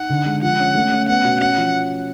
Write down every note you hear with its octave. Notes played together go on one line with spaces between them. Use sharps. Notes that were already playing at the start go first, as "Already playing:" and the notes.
Already playing: D#4 F#5
D3
G#3
F3 F#5
C#4
A3
C#4
B3 F#5
B2
C#4 F#5
F3